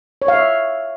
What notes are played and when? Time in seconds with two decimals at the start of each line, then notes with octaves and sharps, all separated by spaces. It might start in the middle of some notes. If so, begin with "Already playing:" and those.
0.22 C#5
0.28 F5
0.35 E5